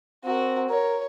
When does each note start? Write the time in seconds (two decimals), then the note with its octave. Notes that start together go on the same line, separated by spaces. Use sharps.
0.24 C4 F#4 A#4
0.70 A#4 C#5